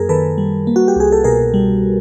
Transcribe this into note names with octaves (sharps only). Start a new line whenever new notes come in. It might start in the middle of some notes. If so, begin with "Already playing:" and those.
Already playing: F#2 A#3 G#4 A#4
D#3 A4 B4
G3
A#3
F#4
G4
C2 G#4
A4
B2 G#4 A#4
G3